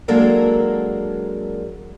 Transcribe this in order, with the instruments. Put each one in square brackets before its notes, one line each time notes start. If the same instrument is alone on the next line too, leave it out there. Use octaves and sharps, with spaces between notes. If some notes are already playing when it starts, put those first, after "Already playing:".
[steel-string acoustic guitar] F#3 G#3 A#3 D4 A4 A#4